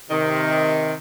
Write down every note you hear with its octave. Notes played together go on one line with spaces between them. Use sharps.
C3 D#3